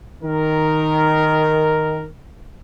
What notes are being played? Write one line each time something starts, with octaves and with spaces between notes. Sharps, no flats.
D#3 A#4